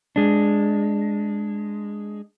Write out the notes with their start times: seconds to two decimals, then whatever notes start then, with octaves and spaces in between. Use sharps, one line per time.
0.16 G#3 D4